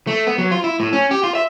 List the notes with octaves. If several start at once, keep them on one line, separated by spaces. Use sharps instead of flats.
A3
B3
F#3
F4
E4
A2
C#4
G4
F4
E5